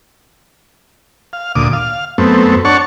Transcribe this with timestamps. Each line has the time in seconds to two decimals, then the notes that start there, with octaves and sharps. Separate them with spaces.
1.33 F5
1.55 D2 A#2 D6 D#6
1.73 F5
2.18 F#2 A3 B3 C4
2.65 D4 C#5 F#5 A5 C#6